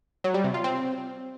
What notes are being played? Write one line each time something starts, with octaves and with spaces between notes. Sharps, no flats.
F#3
G3
C3
F4
C4